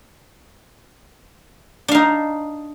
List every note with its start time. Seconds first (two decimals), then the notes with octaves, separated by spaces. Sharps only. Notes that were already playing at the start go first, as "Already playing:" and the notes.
1.88 D4
1.91 F5
1.95 D#4